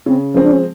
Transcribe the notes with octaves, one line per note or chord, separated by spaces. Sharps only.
C#3 C4
F3 G#3 C4 C#4
D4
C#4